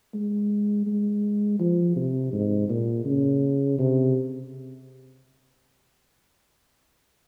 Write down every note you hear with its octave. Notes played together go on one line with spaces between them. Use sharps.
G#3
G#3
F3
C3
G#2
A#2
C#3
C3